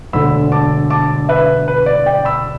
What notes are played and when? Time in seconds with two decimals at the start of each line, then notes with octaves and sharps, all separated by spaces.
0.13 E1 D2 D3 B5 E6
0.52 A5 D6
0.90 A5 D6
1.29 B4 E5
1.68 B4
1.86 D5
2.06 D5 G5
2.25 B5 E6